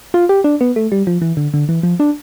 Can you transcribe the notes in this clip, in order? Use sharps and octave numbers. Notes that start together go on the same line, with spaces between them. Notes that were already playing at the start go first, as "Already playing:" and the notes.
F4
G4
D4
B3
A3
G3
F3
E3
D3
D3
E3
F3
D4